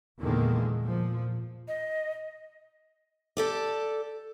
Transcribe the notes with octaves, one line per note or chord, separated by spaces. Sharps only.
E2 A#2 D3 D#3 G#3 A#3
A#2 F3
D#5
G4 A4 D5